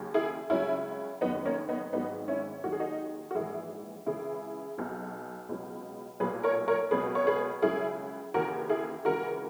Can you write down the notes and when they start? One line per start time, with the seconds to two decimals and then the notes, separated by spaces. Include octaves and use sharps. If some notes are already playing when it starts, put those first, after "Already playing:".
Already playing: D#2 C#3 F#3
0.14 E4 G#4
0.50 C#2 C#3 F#3 C#4 E4
1.21 F#1 F#2 D#3 F#3 B3 D#4
1.45 A#3 C#4
1.69 B3 D#4
1.93 G#1 G#2 D#3 F#3 B3 D#4
2.28 C#4 E4
2.64 D#2 D#3 F#3 F#4
2.72 G#4
2.80 D#4 F#4
3.31 F#4
3.35 A#1 G#2 E3 E4 G#4
4.06 C#2 C#3 E3 E4 G#4
4.78 B1 B2 F#3
5.49 C#2 B2 F#3
6.20 B1 A#2 F#3 G#4 B4
6.43 A#4 C#5
6.68 A#4 C#5
6.91 C#2 B2 F#3 G#4 B4
7.15 C#5
7.27 G#4 B4
7.62 C#2 C#3 F#3 E4 G#4
8.34 D#2 C#3 E3 F#4 A#4
8.69 E4 G#4
9.05 C#2 C#3 E3 F#4 A#4